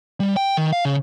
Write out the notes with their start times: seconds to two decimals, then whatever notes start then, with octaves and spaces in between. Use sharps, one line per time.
0.20 G3
0.37 G5
0.57 D#3
0.72 F5
0.85 C#3